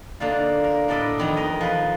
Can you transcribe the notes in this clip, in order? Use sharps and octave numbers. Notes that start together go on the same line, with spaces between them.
D3 A#3 D#4 F4
A#4
A2 D4 A4 D5 D#5 B5
F2 D#3 B3
A#4 D#5
F3 B4